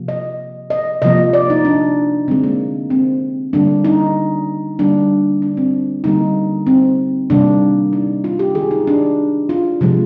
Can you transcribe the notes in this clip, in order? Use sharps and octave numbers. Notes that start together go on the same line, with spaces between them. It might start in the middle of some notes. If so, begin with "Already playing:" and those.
Already playing: C3 F3 A#3
D#5
D#5
C3 F3 A#3 D#5
D5
D#4
D4
D3 G#3 C4
A#3
C4
D3 G3 A#3 D4
D#4
D3 G3 A#3 D4
D4
C4
D3 G3 A#3 D#4
C4
C3 D#3 G3 A#3 D4
D#4
F4
G4
D#3 G#3 G#4
D#4
D4
F4
C3 F3 G#3